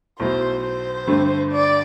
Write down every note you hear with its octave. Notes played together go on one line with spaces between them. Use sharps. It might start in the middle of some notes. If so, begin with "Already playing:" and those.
B1 B2 A3 E4 C5
C5
G2 D3 A3 C4
D5